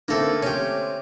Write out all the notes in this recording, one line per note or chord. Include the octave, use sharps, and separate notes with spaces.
D3 A3 A#3 C4 A4
C#4 G4